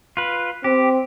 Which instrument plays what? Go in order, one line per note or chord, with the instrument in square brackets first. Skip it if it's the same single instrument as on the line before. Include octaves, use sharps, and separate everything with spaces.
[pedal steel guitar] F4 B4
[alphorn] C4 [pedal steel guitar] G4